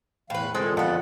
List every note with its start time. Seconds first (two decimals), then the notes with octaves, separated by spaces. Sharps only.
0.30 E2 A2 E3 B4 F5
0.55 E2 A#2 D3 G#3 C4 A4
0.77 F2 B3 A4 F#5